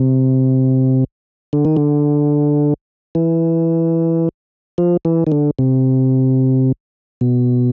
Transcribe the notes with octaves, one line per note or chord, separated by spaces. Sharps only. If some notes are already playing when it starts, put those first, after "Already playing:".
Already playing: C3
D3
D#3
D3
E3
F3
E3
D#3
D3
C3
B2